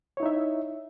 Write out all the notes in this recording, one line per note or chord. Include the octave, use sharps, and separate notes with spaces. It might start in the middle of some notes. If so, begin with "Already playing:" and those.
D#4 E4 C#5 E5